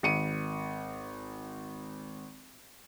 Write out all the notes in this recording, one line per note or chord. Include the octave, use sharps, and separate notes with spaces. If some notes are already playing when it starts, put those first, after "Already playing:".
G#1 C#7 D#7